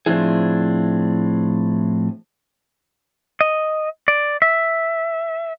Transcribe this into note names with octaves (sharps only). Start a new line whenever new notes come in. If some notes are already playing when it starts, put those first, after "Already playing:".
A2 F3 C4 D4 E4 G#4
D#5
D5
E5